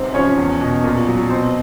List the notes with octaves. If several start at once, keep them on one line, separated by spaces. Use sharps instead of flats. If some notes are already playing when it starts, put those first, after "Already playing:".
Already playing: G#2 C3 C4 C5
F3 C#4 C#5
E2
B2
A#2
F#3
B2 C4 C5